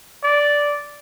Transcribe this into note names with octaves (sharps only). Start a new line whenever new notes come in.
D5